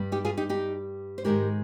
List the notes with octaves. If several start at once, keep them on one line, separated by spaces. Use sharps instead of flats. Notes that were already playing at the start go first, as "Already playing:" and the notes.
Already playing: G2 G3
D#4 G4
F4 G#4
D#4 G4
D#4 G4
C5
G#2 D#3 G#3 G4 A#4